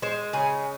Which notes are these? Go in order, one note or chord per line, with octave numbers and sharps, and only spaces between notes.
G#3 C5
C#3 G#4